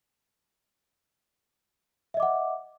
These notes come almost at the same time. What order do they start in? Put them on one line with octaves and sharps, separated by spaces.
E5 D#5 D6 F#5